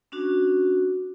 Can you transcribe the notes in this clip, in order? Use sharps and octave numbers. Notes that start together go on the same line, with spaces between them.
C#4 D4 F#4